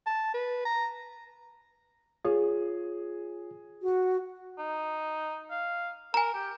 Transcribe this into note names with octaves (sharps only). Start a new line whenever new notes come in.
A5
B4
A#5
F4 G#4 C#5
F#4
D#4
F5
A#4 G#5 A#5
G4